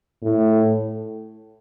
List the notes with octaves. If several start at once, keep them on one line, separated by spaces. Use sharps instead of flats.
A2